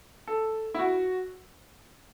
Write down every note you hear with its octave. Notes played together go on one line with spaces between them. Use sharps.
A4
E4
F#4